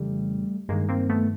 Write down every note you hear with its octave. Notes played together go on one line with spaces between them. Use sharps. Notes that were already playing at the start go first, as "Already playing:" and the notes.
Already playing: F2 C#3 E3 G3 A3
G2 D#3 G#3 A#3
A#3 C4
A3 B3